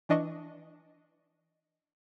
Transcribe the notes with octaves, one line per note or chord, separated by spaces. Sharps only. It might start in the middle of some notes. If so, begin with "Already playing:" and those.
E3 D4 D#5 C#6